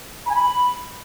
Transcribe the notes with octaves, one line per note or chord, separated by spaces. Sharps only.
B5
G#5
B5